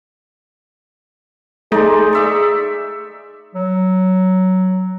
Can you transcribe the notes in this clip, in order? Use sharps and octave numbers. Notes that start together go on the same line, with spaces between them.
A3 D#4 G#4 D5 C6
D5 E5 C#6
F#3